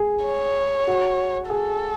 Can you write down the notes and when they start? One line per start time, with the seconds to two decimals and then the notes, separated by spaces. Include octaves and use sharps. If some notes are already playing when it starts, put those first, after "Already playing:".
Already playing: G#4
0.25 C#5
0.87 F#4
1.50 G#4 A4